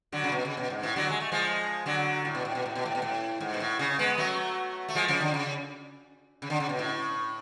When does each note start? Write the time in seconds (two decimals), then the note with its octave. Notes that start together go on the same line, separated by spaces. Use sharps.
0.12 D3 F#3
0.24 C#3
0.32 B2
0.45 C#3
0.57 B2
0.70 G#2
0.83 A2
0.96 D3 F#3
1.10 G#3
1.20 A3
1.32 F3 G#3
1.86 D3 F#3
2.25 A2
2.35 B2
2.45 A2
2.55 B2
2.66 A2
2.75 B2
2.86 A2
2.95 B2
3.02 A2
3.41 G#2
3.54 B2
3.60 A2
3.79 C#3
3.99 G#3 B3
4.18 F#3 A3
4.89 A3
4.95 F3 G#3
5.08 C#3 F3
5.21 D3
5.34 C#3
6.42 C#3
6.50 D3
6.60 C#3
6.69 B2
6.79 A2